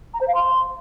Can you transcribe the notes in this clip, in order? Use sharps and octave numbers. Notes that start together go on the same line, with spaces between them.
A#5
C5
F5
C6